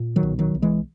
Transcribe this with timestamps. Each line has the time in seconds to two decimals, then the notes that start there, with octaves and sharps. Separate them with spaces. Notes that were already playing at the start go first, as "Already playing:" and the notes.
Already playing: A#2
0.16 D#3 F#3
0.23 B1
0.39 D#3 F#3
0.55 B1
0.62 E3 G#3